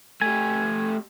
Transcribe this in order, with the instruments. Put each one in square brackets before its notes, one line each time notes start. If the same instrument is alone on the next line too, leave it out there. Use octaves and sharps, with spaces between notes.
[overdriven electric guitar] A3 G4 [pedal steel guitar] G#5